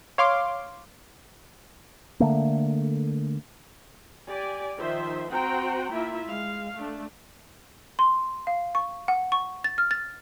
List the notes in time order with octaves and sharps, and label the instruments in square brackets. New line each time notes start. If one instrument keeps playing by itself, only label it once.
[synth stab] C#5 F5 C6 D6
[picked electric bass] D3 A3 A#3
[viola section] G4 D5 G#5
D#3 F3 C5 E5
C4 F#4 C5 F#5 G5 A#5
A#3 E4 F4 E5
G#3 F5
A3 D4
[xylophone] C6
F5
C#6
F#5
C#6
A6
F6
A6